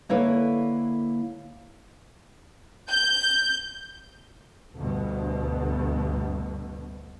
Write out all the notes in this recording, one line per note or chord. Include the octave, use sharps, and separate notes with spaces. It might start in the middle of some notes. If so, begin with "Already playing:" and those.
D3 A#3 E4 A4 B4 C#5
G6
D2 G2 B2